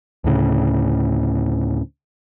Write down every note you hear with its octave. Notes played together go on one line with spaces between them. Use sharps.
D2 A2 C#3